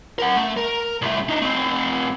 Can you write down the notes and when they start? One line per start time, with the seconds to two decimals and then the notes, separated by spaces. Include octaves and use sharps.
0.18 A#4 F#5
0.36 A3
0.57 A#4
1.02 C2 A3
1.29 D4 D#4
1.42 A3 C4